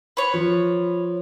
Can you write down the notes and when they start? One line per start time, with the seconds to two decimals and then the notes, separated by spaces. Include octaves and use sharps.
0.17 B4 C#5
0.34 F3